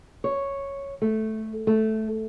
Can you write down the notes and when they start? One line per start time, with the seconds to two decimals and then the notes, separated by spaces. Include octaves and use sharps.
0.24 C#5
1.02 A3
1.67 A3